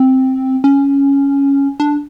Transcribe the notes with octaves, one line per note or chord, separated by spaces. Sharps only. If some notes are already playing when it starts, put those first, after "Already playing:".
Already playing: C4
C#4
D4